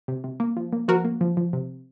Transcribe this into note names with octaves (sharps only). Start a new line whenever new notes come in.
C3
C3
A#3
F3
A#3
F3 F#4 A#4
A#3
F3
F3
C3